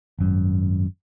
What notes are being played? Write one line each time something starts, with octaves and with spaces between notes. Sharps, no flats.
G#1 F#2